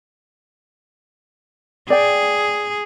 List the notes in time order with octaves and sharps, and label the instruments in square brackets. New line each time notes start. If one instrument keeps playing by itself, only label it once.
[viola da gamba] G#4 [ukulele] D5 G5